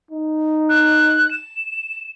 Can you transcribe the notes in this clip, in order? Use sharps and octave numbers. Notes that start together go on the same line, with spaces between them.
D#4
F#6
E7